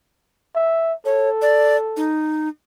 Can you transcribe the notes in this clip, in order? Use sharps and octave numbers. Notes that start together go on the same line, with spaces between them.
E5
A4 C#5
D5
D#4